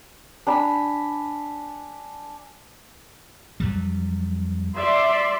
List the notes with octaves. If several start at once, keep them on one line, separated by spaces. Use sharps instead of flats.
D4 G#5 B5
F2 F#3 G3
D5 E5 C6